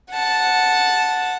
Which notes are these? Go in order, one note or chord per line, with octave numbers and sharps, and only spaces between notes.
F#5 A5